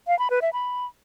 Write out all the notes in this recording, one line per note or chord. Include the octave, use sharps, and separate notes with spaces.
F5
B5
B4
E5
B5